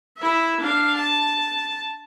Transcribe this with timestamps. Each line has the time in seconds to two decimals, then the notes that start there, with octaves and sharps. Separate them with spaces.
0.18 E4 E5
0.61 D4 F5
0.97 A5